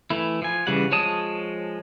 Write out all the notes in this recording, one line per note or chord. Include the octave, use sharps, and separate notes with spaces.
E3 A3 E4
F3 G#5
C#3 E3 G3 F#5
F3 G#3 C#5 A5 D#6